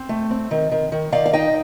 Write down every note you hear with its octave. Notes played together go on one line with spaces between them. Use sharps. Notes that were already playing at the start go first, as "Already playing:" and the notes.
Already playing: C4
A3
C4
D#3
D#3
D#3
D#3 D5 F5
F5
D#4 D#5 G5